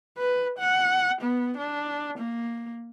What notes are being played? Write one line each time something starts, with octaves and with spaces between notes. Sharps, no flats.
B4
F#5
B3
D4
A#3